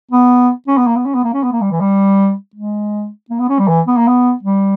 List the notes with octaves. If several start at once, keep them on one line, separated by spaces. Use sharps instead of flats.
B3
C#4
B3
A#3
B3
C#4
B3
A#3
C#4
B3
A#3
G3
E3
G3
G#3
A#3
B3
C#4
G3
E3
B3
A#3
B3
G3